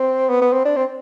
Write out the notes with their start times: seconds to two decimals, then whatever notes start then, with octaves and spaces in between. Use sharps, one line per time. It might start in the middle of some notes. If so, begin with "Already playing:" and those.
Already playing: C4
0.30 B3
0.42 B3
0.53 C4
0.65 D4
0.76 C4